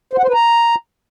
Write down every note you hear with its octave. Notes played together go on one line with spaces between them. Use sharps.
C5
F#5
C5
B4
A#5